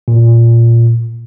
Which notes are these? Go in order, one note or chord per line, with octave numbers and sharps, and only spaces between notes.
A#2